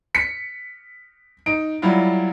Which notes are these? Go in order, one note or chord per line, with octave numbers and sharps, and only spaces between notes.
B6 C#7
D#4 D7
F#3 G3 E4 F4